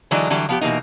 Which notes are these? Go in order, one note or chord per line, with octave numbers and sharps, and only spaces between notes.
D3 E3 F#3 G#3 D4 D#4
D3 E3 F#3 G3
F3 B3 G4
B2 E3 A3 A#3 D#4